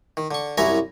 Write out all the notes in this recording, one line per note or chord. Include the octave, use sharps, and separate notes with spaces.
D#3
D3 C#6
C2 F#2 E4 C#5 G#5 A#5